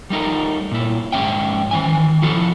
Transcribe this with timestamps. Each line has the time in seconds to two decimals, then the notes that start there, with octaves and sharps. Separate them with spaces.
0.10 G3 A3 D#4 A#4
0.71 A#2 E4
1.12 G#2 E3 C#4 E5 G5
1.71 D#3 E3 G#5
2.22 F3 E4 F#4 A4